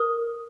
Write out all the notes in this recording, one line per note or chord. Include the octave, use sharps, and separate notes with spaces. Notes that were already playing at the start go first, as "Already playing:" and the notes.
Already playing: A#4 D#6